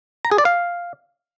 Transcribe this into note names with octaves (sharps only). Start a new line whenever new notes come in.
A#5
G#4
D5
F5